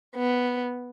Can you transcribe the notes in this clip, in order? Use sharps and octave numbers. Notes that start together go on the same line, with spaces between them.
B3